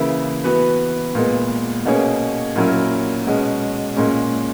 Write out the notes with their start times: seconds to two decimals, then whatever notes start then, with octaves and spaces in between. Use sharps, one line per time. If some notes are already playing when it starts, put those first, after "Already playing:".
Already playing: C#3 E3 A#3 E4
0.44 E3 B3 F#4 B4
1.15 A#2 G#3 B3
1.85 B2 A#3 C#4 G#4 C#5
2.56 A#2 F#3 C#4 E4 A#4
3.27 B2 G#3 C#4
3.97 A#2 G#3 C#4